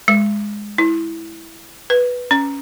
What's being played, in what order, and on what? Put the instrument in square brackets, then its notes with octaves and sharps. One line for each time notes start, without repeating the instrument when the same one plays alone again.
[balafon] G#3
E4
B4
C#4